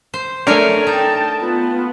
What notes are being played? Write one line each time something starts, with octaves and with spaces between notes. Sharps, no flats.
C5
A3 D4 A4 A#4 C#5 G#5
D#4 G5 A5
B3 F4